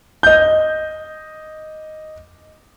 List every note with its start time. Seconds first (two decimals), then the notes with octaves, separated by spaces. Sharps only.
0.23 D#5 G6